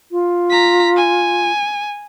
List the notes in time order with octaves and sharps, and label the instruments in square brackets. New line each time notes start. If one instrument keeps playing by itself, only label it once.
[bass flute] F4
[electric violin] A#5 B6
G#5